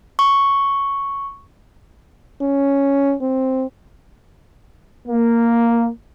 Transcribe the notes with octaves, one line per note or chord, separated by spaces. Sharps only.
C#6
C#4
C4
A#3